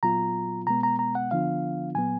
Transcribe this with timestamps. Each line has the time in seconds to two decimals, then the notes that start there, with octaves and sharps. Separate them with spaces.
0.03 A#2 F#3 B3 F4 A#5
0.67 B2 G#3 B3 A#5
0.83 A#5
0.99 A#5
1.15 F#5
1.31 D3 F3 B3 D4 F4 F5
1.95 A#2 F#3 B3 G#5